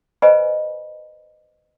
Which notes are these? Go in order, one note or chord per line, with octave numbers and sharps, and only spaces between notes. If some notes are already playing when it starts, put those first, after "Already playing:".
B4 C5 D#5 E5 G#5 B5